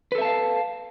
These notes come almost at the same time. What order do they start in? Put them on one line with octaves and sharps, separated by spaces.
B4 A4 E5 A5 F5